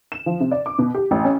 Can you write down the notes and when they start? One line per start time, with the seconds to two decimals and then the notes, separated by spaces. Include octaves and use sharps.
0.12 E7
0.26 F3
0.40 C3
0.51 D5
0.66 D6
0.79 B2
0.95 G4
1.11 A1
1.24 C#4